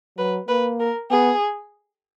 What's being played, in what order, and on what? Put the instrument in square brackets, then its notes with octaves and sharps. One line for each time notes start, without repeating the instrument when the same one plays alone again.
[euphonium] F#3 [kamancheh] B4
[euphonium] A#3 [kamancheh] B4
[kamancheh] A#4
[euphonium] B3 [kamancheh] G#4